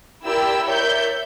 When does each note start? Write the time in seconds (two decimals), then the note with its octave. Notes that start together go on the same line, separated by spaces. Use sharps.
0.24 E4 G4 A#4 D5 G5 E6
0.64 A#4 C#5 D5 E5 G6